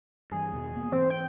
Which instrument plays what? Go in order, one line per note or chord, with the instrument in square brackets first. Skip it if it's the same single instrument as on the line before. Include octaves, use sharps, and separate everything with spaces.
[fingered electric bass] G2 E3 [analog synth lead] G#4
[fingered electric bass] E2 B2 D#3
B2 A#3 B3
[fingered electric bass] G#2 E3 [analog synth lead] C4
[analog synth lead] G5